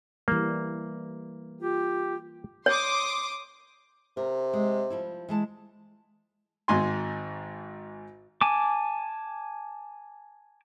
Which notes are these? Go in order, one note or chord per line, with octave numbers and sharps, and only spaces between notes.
E3 G3 A#3
F4 G4
C#5 C6 D6 D#6
C3 A#4
G#3
F3 G3 E4
E3 G#3 A5
G#1 G#2 G#5 C6
G#5 A5 D6